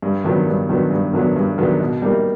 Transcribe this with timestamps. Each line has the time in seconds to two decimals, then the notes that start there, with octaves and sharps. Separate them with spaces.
0.02 G2
0.24 D#3 F#3 B3 D4
0.47 G2
0.69 D#3 F#3 B3 D4
0.91 G2
1.13 D#3 F#3 B3 D4
1.36 G2
1.58 D#3 F#3 B3 D4
1.80 B2
2.02 G3 A#3 D#4